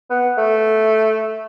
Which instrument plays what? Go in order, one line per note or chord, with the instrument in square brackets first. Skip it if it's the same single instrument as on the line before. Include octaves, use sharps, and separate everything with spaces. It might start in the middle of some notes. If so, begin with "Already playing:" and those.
[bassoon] B3
A3